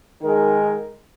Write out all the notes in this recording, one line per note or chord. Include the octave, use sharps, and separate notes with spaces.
D#3 G#3 D#4 A#4